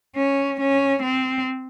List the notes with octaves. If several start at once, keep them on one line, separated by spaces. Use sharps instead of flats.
C#4
C#4
C4